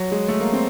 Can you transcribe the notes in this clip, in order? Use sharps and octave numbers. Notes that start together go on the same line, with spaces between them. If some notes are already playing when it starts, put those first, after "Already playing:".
Already playing: F#3
G#3
A3
A#3
C4